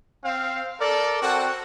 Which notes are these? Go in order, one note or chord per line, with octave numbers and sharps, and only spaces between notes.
C4 F5
A4 A#4 D5
C4 F#4 A4 F#5